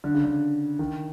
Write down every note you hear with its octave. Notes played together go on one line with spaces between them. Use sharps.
D3
C#3
D3
D#3